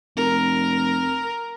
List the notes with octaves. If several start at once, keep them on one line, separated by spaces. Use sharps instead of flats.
F1 A#4